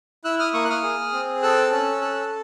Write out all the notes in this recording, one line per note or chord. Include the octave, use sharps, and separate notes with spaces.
E4 E6 F#6
D#6 F6
A#3 C#6 D#6
F#6
D#6 F6
G#4
C4
A4 E6 F#6
C#4
A4